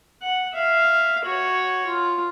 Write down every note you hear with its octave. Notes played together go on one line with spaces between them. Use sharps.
F#5
E5 F5
F#4 C#5
F4